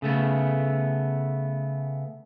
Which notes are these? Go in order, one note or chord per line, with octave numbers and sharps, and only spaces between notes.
C#3 A3 B3